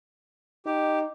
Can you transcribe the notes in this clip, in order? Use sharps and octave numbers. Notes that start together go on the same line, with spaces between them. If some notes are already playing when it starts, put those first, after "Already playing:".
D#4 G4